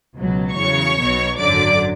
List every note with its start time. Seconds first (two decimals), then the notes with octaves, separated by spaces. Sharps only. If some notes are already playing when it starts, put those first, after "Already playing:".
0.15 C#2 B2 F#3
0.56 E2 C#3 F#3 C#5 C#6
0.98 B1 B2 F#3
1.38 G#1 F#2 D3 F#3 D5 D6